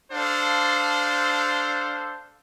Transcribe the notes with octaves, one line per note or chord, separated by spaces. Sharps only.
D4 A4 C5 F5